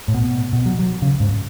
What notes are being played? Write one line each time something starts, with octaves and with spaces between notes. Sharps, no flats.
A2
B2
B2
F#3
F#3
C#3
G#2